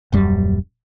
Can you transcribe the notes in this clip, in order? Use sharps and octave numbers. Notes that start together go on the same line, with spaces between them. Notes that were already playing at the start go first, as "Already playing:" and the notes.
D#1 F#2 G3